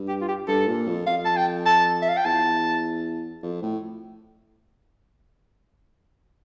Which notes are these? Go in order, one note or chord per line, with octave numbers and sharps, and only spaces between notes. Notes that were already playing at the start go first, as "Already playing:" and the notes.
Already playing: G2
G4
F4
G4
G2 A4
A#2
F2
F2 F5
A5
G5
A5
E5
F5
G5
E2 A5
F2
A2